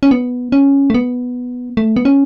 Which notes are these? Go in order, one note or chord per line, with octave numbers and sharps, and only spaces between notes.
C#4
B3
C#4
A3
B3
A3
B3
C#4